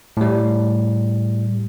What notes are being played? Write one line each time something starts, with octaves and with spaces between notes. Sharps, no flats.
A2 G3